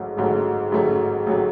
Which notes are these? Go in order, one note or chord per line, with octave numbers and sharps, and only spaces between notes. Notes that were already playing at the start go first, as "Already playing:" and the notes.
Already playing: A1 G#2 F#3 A3
A1 G#2 F#3 A3
A1 G#2 F#3 A3
A1 F#3 A3